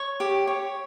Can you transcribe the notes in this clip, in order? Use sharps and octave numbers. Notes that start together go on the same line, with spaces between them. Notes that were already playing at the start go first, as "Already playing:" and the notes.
Already playing: C#5 C#6
G4
C#5